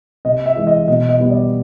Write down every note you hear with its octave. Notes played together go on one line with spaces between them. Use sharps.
C3 D#5
E5
E3 G#3
D#5
B2 D#5
D#5
G3 B3
D5